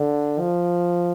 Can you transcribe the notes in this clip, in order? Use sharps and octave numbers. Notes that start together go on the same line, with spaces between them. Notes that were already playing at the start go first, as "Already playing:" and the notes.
Already playing: D3
F3